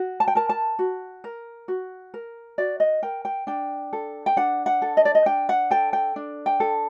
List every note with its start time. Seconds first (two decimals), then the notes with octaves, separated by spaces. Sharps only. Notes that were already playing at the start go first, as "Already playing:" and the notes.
Already playing: F#4
0.20 A5
0.28 G5
0.35 A#4 A5
0.49 A5
0.79 F#4
1.24 A#4
1.68 F#4
2.14 A#4
2.58 F#4 D5
2.80 D#5
3.02 A#4 G5
3.25 G5
3.47 D4 G5
3.93 A4
4.26 G5
4.37 D4 F#5
4.66 F#5
4.82 A4
4.97 D#5
5.05 D5
5.15 D#5
5.26 D4 G5
5.49 F#5
5.71 A4 G5
5.93 G5
6.16 D4
6.46 G5
6.60 A4